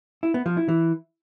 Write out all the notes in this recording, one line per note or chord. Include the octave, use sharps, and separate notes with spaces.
E4
B3
F3
E4
E3